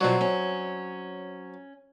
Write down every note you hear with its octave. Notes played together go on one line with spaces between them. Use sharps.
G2 B2 F3 F#3 C4
C#4